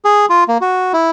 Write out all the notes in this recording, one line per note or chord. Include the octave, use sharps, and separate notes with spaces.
G#4
F4
A#3
F#4
E4